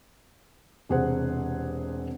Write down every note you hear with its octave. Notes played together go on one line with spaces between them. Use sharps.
E1 C3 G#4 C5 F#5